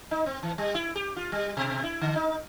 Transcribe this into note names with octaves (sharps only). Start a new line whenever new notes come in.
D#4
C4
E3
G3
E4
G4
F4
G3
B2
E4
D3
D#4